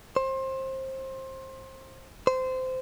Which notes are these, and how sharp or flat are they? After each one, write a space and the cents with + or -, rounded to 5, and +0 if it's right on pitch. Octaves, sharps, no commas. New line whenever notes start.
C5 +25
C5 -20